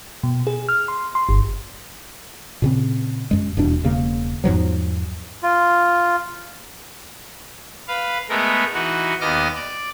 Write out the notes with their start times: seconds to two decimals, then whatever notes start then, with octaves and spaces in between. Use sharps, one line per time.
0.23 B2
0.47 G#4
0.69 F6
0.88 C6
1.15 C6
1.29 G1
2.62 A#2 C#3 C4
3.31 F#2 G#3
3.57 D#1 E2 B2 D4
3.84 E1 C#3 A#3
4.44 E2 G#2 F3 F#3
5.43 F4
7.88 B4 F5
8.29 G#3 A3 B3 A#4
8.74 E3 D#4 F#4
9.21 D#2 B3 D#5 D6 F6
9.56 D5